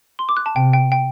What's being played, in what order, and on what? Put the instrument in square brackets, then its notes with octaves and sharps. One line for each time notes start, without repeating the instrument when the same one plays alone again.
[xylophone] C6
D6
F#6
A5
[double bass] C3 [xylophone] G5
[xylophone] G5
G5